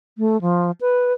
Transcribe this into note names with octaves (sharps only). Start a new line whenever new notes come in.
A3
F3
B4